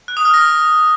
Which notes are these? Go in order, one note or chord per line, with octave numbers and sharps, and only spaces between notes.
F#6
D#6
F6
A#6